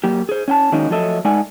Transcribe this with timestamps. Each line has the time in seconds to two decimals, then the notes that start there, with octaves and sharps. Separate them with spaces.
0.04 F#3 A#3 G4
0.29 G#4 C5
0.48 C#4 G5 A5
0.72 D#3 F#3 G#3 A#3 C#4 D#4
0.90 F3 F#3 A3 A4 D#5 E5
1.25 G#3 A3 D#4 D5 F#5 G#5